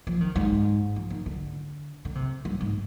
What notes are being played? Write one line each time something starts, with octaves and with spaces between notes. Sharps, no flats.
F3
D#3
G#2
F3
D#3
D3
D3
C3
G2
G#2